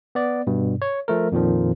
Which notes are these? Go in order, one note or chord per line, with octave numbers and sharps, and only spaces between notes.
B3 D5
G2 B2
C#5
F3 A3 A#4
F2 A#2 D#3 F3